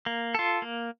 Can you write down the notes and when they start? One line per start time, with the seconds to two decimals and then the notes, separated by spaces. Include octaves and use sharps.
0.06 A#3
0.35 F4 A4
0.62 A#3